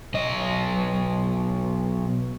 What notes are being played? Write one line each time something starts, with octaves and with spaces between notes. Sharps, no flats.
B1 D#5